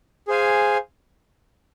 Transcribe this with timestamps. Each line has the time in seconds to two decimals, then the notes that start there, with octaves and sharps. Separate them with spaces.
0.28 G#4 C5 F5 G#5